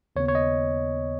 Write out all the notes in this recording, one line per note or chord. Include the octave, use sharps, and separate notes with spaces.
D#2 C#3 B3 C#5
C#5
D#5